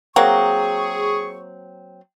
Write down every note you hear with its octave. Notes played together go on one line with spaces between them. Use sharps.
F#3 A#3 C4 G#4 C#6